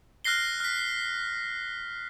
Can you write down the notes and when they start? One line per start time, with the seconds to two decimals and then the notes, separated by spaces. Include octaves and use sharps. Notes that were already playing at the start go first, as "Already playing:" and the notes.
0.25 F6 F#6 A#6 C7 G7
0.60 F6 B6